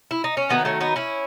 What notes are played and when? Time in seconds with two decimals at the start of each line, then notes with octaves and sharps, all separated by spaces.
0.11 E4
0.24 D#4
0.37 C#4
0.49 D#3 F#3 A3 B3
0.65 A3 C#4
0.81 B3 D#4
0.96 C#4 E4